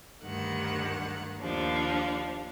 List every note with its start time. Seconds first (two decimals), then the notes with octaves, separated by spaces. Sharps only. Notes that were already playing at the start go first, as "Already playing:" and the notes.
0.24 D2 G2 D#3 F#5
1.42 D#2 F3 D4